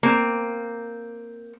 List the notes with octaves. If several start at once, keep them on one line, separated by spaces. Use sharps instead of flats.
A#3 C4